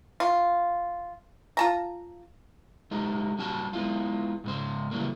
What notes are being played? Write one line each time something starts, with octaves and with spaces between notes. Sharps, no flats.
F4
F4 A5 A#5
G#3 A3 D#4 G4
G3 C#4 F#4 G4 A5
G#3 B3 E4 F4
G#2 C#3 C5
C#3 E3 F#3 G3 A3 A#3